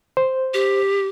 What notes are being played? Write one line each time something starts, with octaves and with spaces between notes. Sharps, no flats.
C5
G4